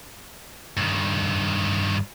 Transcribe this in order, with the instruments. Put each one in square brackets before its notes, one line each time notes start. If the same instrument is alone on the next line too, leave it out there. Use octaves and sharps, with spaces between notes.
[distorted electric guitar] G2 D#3